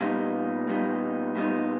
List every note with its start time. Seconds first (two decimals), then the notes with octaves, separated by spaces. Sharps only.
0.01 A#2 G3 B3 D#4
0.67 A#2 G3 B3 D#4
1.35 A#2 G3 B3 D#4